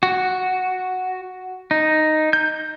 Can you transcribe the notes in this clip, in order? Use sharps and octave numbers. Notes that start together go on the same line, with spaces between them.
F#4
D#4
G6